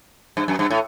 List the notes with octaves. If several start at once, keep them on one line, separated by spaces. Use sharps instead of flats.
G2
F#2
G2
A2